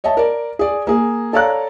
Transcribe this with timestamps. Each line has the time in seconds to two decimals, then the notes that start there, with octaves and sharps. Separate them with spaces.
0.04 C#5 D#5 E5 A5
0.17 A#4 D5
0.59 G#4 D5
0.87 A#3 G#4
1.33 A4 C#5 D5 F5 A#5 F#6